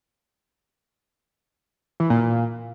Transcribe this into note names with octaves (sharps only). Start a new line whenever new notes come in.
E3
A#2
A#2